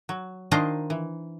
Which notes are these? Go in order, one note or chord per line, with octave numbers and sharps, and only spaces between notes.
F#3
D#3 D4 F4 A#4 C5 D#5
E3